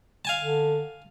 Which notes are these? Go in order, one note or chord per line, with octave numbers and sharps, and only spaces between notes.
F5 G#5 A5
D3